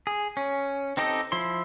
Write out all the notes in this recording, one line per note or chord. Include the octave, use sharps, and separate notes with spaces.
G#4
C#4
C4 D#4 G4 A4 D#5
F3 E4 C6